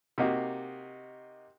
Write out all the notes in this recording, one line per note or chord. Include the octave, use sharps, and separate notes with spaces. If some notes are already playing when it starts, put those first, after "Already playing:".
C3 A#3 D#4 F#4